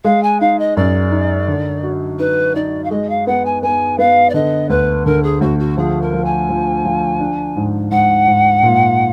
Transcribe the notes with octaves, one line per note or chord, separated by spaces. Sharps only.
G#3 F5
G#5
D#4 F5
D#5
F#2 D5
D#4
D3
F#4
D#4 B4
D#4 D5
F5
G#3 D#5
F5
B3 F#5
G#5
B3 G#5
B3 F5
D5
D3 D#5
D2 B4
D3 A#4
G#4
D2 F#4
F#4
F3 G#4
A#4
F3
G#5
F3
F3
D4
G#2
G#2 F#5
G#2
A#2